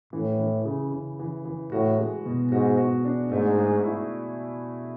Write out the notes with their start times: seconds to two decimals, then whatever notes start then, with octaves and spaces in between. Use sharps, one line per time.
0.13 A2 E3
0.39 E3
0.65 C#3
0.92 C#3
1.19 E3
1.45 E3
1.72 A2 F#4
1.99 G#3
2.26 B2
2.51 G#2 F#4
2.77 F#4
3.05 D4
3.32 G#2 A3
3.58 G#4
3.84 E4